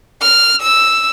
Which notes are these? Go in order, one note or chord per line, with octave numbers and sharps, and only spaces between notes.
F6
E6